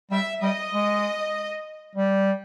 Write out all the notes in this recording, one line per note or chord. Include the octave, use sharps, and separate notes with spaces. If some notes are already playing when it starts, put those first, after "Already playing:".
G3 E5
G3 D#5
G#3
G3